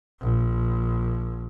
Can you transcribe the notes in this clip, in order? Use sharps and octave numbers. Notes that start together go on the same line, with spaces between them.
A#1